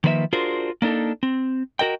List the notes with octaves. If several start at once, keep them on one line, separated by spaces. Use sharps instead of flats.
D#3 F3 A#3 B4 D5 E5
D4 F4 F#4 G#4 A#4 C5
A#3 D4 D#4 A4
C4
F#4 A#4 D#5 G5